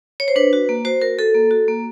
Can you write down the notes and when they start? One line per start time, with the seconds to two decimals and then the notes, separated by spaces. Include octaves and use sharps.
0.20 C#5
0.28 C5
0.36 D4 B4
0.53 F#4
0.69 A#3
0.85 F#4 C5
1.01 F#4 A#4
1.18 F#4 A4
1.34 A#3
1.51 F#4
1.68 A#3